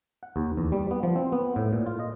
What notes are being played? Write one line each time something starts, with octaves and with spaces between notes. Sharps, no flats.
F#5
D#2
E2
G3
B3
F3
C4
B3
A2
A#2
F4
D#5